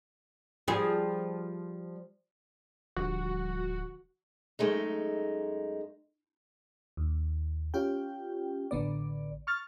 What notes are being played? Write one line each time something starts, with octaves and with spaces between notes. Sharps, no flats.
F3 G3 G#4
D1 D3 F3 G3 F#4
F#2 G#3 A3 D#4
D#2
C#4 F4 G4 G5
A1 D3 B3 D5
C#6 F6 A6